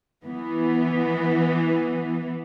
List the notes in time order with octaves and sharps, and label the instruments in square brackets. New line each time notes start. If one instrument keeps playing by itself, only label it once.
[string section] E3 B3